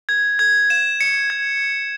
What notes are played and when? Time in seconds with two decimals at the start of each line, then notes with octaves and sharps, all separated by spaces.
0.09 G#6
0.39 G#6
0.70 E7
1.01 C#7
1.30 G#6